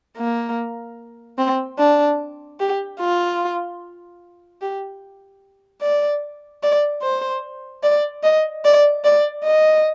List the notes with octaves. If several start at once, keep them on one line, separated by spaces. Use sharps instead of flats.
A#3
C4
D4
G4
F4
G4
D5
D5
C5
D5
D#5
D5
D5
D#5